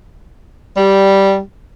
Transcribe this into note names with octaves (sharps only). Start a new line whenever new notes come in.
G3